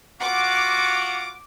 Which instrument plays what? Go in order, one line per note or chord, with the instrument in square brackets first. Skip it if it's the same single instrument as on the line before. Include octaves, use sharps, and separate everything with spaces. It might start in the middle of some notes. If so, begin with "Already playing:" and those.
[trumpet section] F4 F#4 [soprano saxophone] F#5 [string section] D6